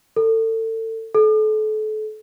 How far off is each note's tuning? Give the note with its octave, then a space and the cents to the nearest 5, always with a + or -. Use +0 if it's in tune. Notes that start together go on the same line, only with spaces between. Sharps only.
A4 +30
A4 -35